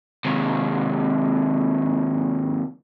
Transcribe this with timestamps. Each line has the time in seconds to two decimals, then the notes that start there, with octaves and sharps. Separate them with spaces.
0.25 D#2 C3